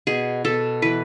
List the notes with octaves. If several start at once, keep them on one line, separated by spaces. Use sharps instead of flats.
B2 G#4
B2 A4
E3 B4